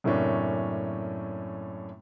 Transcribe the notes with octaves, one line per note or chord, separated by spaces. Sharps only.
F#2 A2 C3 A#3 C#4 D4